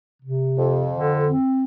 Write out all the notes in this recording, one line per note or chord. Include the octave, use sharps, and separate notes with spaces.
C3
F2
D3
C4